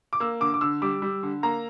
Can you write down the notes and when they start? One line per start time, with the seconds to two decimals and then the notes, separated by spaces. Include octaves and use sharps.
0.13 D6
0.20 A#3 E6
0.40 D3 D6
0.54 D6
0.61 D3 E6
0.82 G3 D6
1.02 G3
1.23 D3
1.43 A#3 A#5